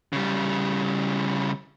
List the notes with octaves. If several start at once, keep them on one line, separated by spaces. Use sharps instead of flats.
C#3 G3